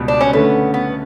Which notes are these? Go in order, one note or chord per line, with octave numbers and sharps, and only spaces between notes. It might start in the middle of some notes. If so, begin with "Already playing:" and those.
Already playing: C#2 B2 G3
D4
C#4
D3 A3 B3 C#4
B3